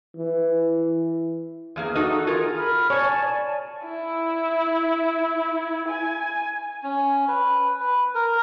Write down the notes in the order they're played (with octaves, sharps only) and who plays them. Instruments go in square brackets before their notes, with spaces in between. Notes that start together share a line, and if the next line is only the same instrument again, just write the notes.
[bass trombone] E3
[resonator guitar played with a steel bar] E2 A#3 G#4
D#4 F#4 A4 D#5
F4 G#4 A#4
[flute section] B5 F6
[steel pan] C#5 [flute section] D5 G#5 A5
[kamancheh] E4
G#5
[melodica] C#4
B4
B4
A#4